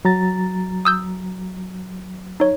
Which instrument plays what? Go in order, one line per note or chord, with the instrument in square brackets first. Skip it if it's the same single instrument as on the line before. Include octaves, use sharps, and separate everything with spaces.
[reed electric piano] F#3 A#5 A6
[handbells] D#6 E6 G6
D#4 C#5